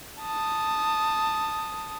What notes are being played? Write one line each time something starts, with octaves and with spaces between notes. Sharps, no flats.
A5 D#6